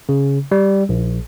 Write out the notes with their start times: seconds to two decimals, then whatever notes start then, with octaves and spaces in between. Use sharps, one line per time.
0.09 C#3
0.52 G3
0.89 A#1